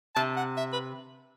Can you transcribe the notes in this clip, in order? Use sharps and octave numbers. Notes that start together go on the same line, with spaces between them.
C3 A5
F#5
E5
B4